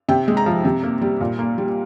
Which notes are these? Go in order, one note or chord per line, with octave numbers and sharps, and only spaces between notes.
C3 G5
G#3
A#5
F3
C3
A#3
G3
A#2
A#3
G3